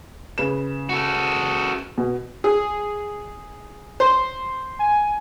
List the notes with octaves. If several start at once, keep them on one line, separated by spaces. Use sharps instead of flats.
C#3 B4 E7
F#4 A4
B2
G#4
C5
G#5